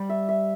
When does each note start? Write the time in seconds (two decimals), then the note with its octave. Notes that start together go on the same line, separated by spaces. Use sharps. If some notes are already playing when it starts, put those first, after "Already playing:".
Already playing: G3
0.09 E5
0.29 E5